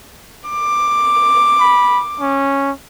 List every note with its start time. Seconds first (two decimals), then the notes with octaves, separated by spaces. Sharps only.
0.50 D6
1.59 B5
2.20 C#4